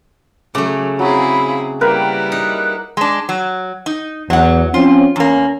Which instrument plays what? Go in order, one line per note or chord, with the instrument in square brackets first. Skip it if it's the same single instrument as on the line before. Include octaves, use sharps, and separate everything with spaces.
[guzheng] C#3 A3 [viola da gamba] F#3 [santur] D6
[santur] F#3 [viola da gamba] C4 E4 G#4 [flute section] F5 B5
[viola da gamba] G3 E4 [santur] A#3 A#4 B4 [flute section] G5
[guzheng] D#4 [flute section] F#6
[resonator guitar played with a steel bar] G#3 D4
F#3
D#4
[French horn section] E2 [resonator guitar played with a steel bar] F#3 F#5
[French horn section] F3 C4 C#4 [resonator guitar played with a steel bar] F4
[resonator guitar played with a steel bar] E2 A#3 [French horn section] C#4